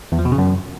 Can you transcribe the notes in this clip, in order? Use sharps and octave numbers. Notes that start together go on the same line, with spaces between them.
E2
F3
B2
C#3
F#2